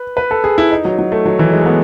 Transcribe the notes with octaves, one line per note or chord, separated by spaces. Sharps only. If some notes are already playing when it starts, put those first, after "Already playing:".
Already playing: B4
B4
A4
G#4
E4
D#4
F#3
F#3
A3
F#3
E3
G#3
A3
B3